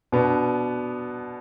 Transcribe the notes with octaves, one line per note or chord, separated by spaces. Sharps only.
B2 B3 D4